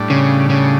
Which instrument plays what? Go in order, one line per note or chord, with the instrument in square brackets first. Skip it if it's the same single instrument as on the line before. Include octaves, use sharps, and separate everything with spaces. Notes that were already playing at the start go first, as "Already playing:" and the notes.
Already playing: [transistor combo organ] A2 G3 D4
[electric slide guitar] C#3
C#3